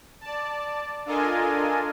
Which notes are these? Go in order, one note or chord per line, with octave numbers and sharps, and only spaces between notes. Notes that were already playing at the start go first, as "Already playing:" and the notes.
D5 A5
D4 F4 A4 A#4 D#5 G#5